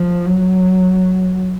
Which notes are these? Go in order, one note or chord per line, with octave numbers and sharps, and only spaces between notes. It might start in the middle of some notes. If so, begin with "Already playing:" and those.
Already playing: F3
F#3